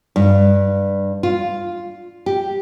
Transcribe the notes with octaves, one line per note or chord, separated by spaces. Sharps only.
G2
F4
G4